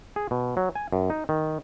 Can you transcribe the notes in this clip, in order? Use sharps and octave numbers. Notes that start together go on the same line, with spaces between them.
G#4
B2
F#3
G#5
F#2
D#4
D#3